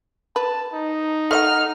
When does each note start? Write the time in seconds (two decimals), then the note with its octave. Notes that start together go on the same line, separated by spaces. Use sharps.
0.36 B4 A5
0.73 D#4
1.31 A3 D#5 F#5 F6